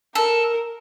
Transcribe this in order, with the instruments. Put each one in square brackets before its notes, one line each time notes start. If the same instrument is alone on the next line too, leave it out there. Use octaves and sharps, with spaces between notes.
[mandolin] A4 [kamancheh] A#4